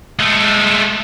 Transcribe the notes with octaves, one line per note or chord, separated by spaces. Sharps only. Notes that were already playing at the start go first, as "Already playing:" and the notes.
G#3 A3